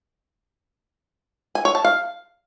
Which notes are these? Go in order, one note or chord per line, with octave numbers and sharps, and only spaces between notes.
G#5
C#5
A5
F5